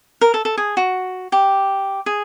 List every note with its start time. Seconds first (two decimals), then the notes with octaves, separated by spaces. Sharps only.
0.21 A#4
0.34 A4
0.45 A4
0.58 G#4
0.77 F#4
1.32 G4
2.06 G#4